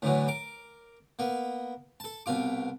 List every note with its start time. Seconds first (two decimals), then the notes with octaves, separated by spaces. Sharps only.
0.02 A2 D3 E3 F#3
0.28 A#4 D6
1.19 A#3 B3
2.00 A4 A5
2.26 C2 B2 F4 D6